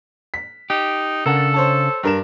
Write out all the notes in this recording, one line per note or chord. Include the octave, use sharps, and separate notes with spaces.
B6
D#4 G4
C#3 D4 A4 A#4 F#5 A5
C5 C#5 A5
G2 A#4 E7